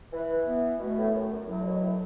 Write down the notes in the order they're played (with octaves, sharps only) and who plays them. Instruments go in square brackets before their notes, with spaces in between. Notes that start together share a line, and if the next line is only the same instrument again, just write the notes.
[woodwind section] E3 [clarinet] B4
[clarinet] B3
[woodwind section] B2 [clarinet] A3
[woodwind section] A2
F#2
F#2
[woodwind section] A2 [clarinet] F#3
[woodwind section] D3
B2
A2